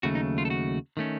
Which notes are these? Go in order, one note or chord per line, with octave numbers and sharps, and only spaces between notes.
D#2 C#3 F#3 A3 F#4
D#4
F4
A4
F#4
D#3 A3 C#4